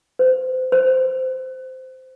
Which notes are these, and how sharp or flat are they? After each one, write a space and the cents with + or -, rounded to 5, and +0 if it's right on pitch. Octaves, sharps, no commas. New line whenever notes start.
C5 -30
C5 -10